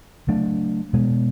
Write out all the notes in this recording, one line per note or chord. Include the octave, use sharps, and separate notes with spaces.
C#3 F#3 A3 D4
B2 G#3 B3